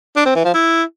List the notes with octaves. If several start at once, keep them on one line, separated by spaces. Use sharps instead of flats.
D4
C4
E3
F3
E4